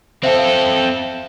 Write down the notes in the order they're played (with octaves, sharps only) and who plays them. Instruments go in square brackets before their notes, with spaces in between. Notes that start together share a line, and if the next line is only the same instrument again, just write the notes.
[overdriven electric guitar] C4 A4 [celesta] C5 E5 F5